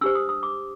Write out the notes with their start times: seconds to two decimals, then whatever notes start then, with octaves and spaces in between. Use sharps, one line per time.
0.01 D4 G4 C5 E6
0.15 D#6
0.29 D#6
0.43 D6